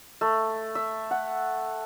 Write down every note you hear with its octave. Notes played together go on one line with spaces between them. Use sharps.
A3
E5
F#5